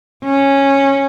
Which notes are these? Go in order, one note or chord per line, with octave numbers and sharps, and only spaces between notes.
C#4